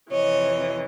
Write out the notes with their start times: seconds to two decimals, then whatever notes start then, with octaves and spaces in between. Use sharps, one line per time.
0.11 F2 C3 E3 C#5 D#5